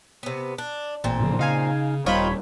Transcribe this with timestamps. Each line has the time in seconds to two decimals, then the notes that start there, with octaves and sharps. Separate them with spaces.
0.23 C3 B3
0.58 D4
1.04 A1 A#2 C4
1.20 A2 C#3 F3
1.39 C#3 D#4 F5 G#5
2.06 D#1 G3 C4 D#4 F4 C#5 B5